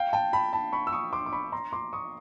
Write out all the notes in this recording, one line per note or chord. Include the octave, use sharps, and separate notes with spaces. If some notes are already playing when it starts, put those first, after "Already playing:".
Already playing: F5 G5
G5 A5
A5 B5
A5 B5
B5 C#6
E6
C#6 D#6
C6 D6
D6
B5 C#6
A#5 C6
C6 D6
C#6 D#6